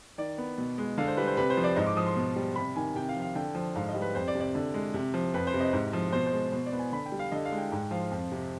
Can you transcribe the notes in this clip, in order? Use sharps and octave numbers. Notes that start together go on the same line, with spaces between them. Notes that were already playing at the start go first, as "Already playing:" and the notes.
D#3 D5
B3
B2
G#3
D3 F5
C5
G3 B4
C5
C3 B4
C5
F3
D5
G#2 D#5
D6
F3 D#6
C6
B2
G3
C3 B5
D#3 G#5
C3 G5
F5
F3
F5
D3 G5
F3
G#2 F5
D#5
G3
B4
F2 C5
D5
C3
D5
D3
G#3
C3
F3
F2 B4
C5
C3
D#5
G#2
F3
B2 C5
C5
G#3
B2 C5
D5
B3
G#5
D3 B5
G5
G3
F5
D3 D#5
F5
G#3
G5
G#2 G5
F3 F5
F2
C3